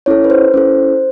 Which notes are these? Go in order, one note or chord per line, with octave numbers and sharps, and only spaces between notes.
C#4 E4 A4 C#5
B4
C5
C#4 E4 A4